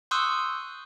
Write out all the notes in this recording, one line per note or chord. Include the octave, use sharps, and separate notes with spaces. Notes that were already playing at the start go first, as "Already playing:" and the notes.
C6 C#6 D#6 E6 F#6 G6